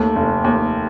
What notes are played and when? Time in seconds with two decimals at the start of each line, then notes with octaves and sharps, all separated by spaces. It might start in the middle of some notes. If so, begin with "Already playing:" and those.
Already playing: D#2 A3
0.15 F1
0.44 D#2